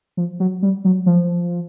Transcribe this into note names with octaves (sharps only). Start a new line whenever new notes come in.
F3
F#3
G3
F#3
F3